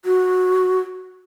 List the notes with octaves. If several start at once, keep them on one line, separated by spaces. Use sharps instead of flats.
F#4